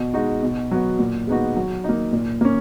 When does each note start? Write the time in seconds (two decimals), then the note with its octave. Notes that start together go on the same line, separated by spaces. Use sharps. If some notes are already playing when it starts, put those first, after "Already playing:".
Already playing: B2
0.14 G#3 D#4 F#4
0.43 B2
0.71 F#3 B3 F#4
0.99 A#2
1.27 G#3 B3 D#4 F#4
1.56 F#3
1.84 A#3 D#4
2.13 A#2
2.41 A#3 C#4